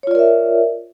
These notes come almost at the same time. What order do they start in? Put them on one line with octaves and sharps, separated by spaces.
C#5 F4 D5 A#4 E5